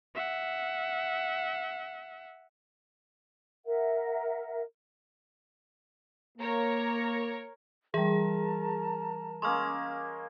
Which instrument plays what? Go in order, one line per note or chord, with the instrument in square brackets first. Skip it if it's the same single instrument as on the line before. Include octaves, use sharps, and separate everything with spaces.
[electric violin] E5 F#5
[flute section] A#4 E5 F#5
[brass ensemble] A#3 [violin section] A#4 C#5 A#5
[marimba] E3 G3 [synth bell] G#4 [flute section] A#4 A5 A#5
[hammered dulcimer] G#3 A#3 C#4 [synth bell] C6 C#6 F6